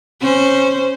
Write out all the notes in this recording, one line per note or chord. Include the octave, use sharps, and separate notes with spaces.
C#4 C5